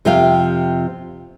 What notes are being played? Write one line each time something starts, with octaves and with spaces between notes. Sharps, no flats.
F2 C3 F4 E5 F5 G5